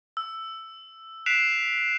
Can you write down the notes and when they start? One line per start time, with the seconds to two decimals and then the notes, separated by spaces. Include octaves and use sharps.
0.17 E6
1.26 F#6 B6 C7 D7 E7 F7